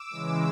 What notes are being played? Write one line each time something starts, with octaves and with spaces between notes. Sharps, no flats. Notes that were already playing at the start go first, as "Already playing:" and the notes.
Already playing: D6 E6
C#3 E3 G#3